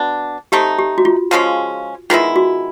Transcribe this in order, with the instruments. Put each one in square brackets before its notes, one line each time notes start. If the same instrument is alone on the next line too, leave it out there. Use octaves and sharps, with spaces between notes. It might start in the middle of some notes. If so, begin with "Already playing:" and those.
Already playing: [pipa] B2 B3 D4
[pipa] A3 C4 D#4 [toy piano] G4
[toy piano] G4
F#4
F4
[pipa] C#3 F3 G#3 C#4
[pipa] D#3 G#3 B3 E4 [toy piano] F4
[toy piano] F#4